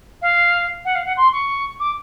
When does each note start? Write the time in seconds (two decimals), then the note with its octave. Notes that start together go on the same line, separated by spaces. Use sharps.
0.22 F5
0.85 F#5
0.95 F5
1.06 F#5
1.17 C6
1.33 C#6
1.80 D6